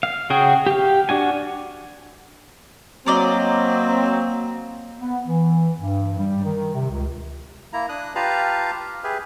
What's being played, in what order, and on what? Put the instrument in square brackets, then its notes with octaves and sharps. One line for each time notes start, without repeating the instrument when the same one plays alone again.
[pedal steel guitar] F5
C#3 F#4 G#4 G5
G4 F5
D4 F#4 G#5
[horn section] F#3 [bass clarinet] A#3 [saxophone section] C4 [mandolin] A#4 D5 D#5
[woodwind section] B3
E3
G2
G3
D#3
C3
C#2
[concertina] A#3 E4 A#5
D4 D#6 F#6
F4 G4 B4 F5 A5 A#5
G4 G#4 B4 E5